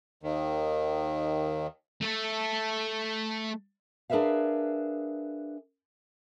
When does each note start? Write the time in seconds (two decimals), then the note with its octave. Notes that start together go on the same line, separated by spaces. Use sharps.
0.23 D#2 D#3
2.01 A3 A4
4.10 D4 G#4 A#4 B4 E5 F5